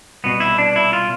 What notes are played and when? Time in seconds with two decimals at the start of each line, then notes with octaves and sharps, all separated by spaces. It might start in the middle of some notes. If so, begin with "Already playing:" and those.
0.24 C2 B2 B3
0.40 E4
0.58 D4
0.76 E4
0.93 F4